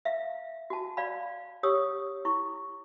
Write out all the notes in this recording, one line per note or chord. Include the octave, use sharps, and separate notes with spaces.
E5 F5
F#4 A5
D5 F5 B5
G4 C#5 D#6 E6
E4 C#6